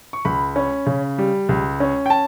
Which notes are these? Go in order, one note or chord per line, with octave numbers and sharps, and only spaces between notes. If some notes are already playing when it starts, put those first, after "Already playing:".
C#6
C#2 B5
C#4
C#3
G3
C#2
C#4
G5
A5